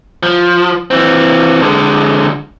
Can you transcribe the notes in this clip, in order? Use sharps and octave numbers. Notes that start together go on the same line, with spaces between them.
F3
E3 C4
D3 G#3